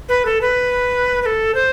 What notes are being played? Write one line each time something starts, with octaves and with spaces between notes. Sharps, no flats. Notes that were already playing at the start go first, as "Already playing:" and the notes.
B4
A4
B4
B4
A4
C5